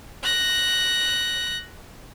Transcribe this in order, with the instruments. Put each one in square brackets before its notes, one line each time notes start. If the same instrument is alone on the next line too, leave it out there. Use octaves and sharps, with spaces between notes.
[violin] F#6 A#6